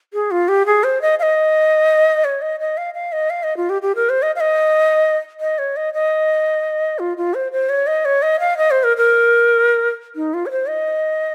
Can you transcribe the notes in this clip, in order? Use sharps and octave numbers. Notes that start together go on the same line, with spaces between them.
G#4
F4
G4
G#4
C5
D#5
F5
D#5
C#5
D#5
D#5
F5
F5
D#5
F5
D#5
F4
G4
G4
A#4
C5
D#5
F5
D#5
D#5
C#5
D#5
D#5
F4
F4
C5
C5
C#5
D#5
C#5
D#5
F5
D#5
C5
A#4
A#4
D#4
F4
C#5
C5
D#5